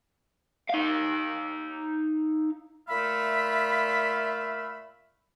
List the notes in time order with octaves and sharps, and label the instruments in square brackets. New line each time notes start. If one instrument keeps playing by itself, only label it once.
[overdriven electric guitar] D#4 F5
[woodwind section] A#2 A3 E5 F5 B5